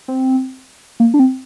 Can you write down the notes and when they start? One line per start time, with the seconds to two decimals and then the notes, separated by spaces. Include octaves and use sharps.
0.08 C4
1.00 A#3
1.14 D4
1.19 C4